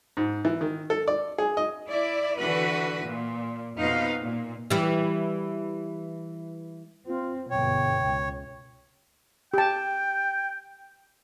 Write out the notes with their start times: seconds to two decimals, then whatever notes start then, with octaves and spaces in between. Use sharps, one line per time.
0.17 G#2
0.45 E3
0.61 D#3
0.90 A4
1.08 D5
1.38 G#4
1.57 D#5
1.89 E4 D5
2.39 D3 E3 F#4 B4
3.02 A#2
3.78 F2 B2 D#4 B4 F5
4.21 A#2
4.70 E3 G3
7.07 C4 F4
7.50 G1 B2 C#5 G5
8.04 C#2
9.54 G4 G5 A5